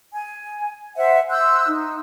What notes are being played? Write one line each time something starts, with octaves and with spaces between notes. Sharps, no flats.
G#5
C5 E5 F#5
C6 E6 F#6 G6
D#4